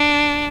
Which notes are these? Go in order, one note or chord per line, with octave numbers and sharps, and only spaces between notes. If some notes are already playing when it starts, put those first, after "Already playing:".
Already playing: D4